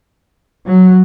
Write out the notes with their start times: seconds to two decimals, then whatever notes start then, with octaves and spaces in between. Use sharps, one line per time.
0.66 F#3